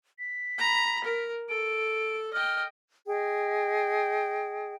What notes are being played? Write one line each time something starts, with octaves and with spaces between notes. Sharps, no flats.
B6
A#5 B5
A#4
A4 D7
D#5 G5 F6
G#4 D#5 G5